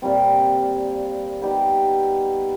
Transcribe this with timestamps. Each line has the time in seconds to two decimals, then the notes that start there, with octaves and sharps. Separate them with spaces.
0.02 A#2 G3 C4
1.42 G3 B3 D#4 G4